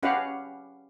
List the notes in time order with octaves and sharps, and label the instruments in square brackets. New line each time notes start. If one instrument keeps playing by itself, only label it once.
[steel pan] C#4 F#4 G4 B4 F5 F#5